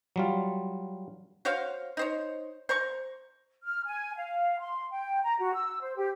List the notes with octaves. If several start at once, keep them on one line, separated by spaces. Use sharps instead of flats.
F#3 G3 F4
F#4 C5 C#5 F5
D#4 C5 C#5
C5 A#5 C#6
F6
G#5
F5
C6
G5
A#5
F#4
E6
C5
G4